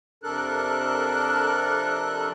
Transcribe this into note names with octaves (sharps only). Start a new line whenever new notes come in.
F2 C3 D4 A4 A#4 F#6